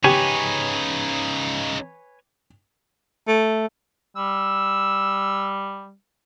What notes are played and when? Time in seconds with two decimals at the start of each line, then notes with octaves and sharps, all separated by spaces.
0.04 C#3 D#4 G4 B4 C#5 G#5
3.28 A3
4.17 G3 E6